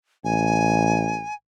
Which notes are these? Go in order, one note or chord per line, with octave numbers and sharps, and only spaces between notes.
A1 G#5